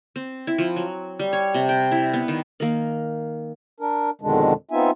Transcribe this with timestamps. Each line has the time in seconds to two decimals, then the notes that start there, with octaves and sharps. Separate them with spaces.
0.16 C4
0.47 E4
0.58 F3
0.76 F#3
1.19 G3
1.33 C#5
1.54 C3
1.69 G5
1.91 E4
2.14 B3
2.28 D#3
2.60 D#3 A#3
3.80 D4 A#4
4.21 F2 B2 D3 D#3 G#3 D4
4.71 B3 C4 D#4 F4 E5 G#5